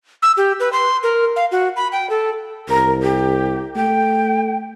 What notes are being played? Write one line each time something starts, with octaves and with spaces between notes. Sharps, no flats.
E6
G4
B4
C6
A#4
F5
F#4
B5
G5
A4
C2 A#4
G4
A3 G5